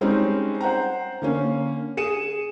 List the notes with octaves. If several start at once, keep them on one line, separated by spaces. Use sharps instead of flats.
G3 G#3 C4 C#4 D#4
C5 F#5 G5 A#5
D3 A#3 C#4
G#4 C#7 D#7 E7